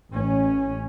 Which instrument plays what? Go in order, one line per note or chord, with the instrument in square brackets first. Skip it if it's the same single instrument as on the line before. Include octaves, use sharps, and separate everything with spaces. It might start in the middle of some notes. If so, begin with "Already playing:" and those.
[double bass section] A1 C#4